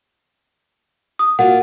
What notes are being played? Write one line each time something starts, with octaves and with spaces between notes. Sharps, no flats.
D#6
A#3 F4 F#4 F#5